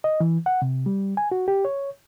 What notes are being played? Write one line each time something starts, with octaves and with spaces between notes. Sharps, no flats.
D#5
E3
F#5
C3
G3
G#5
F#4
G4
C#5